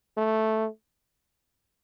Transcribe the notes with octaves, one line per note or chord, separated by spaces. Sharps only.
A3